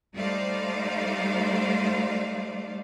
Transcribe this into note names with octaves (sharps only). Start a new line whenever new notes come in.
G3 A3 D#4 C5 D5 F5